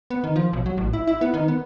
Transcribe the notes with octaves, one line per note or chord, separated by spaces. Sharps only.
B3
D#3
F3
B1
F#3
A1
E4
E4
B3
D#3
B3